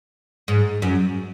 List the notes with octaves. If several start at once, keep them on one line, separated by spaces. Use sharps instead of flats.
G#2
F#2